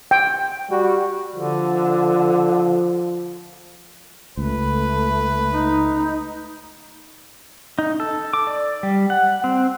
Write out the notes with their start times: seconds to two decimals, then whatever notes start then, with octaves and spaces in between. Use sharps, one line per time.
0.11 G5
0.70 G3 F#4
1.35 D3 F3
4.37 C#2 A3 B4
5.52 D#4
7.79 D#4
8.00 A4
8.33 D6
8.47 D5
8.83 G3
9.10 F#5
9.44 C4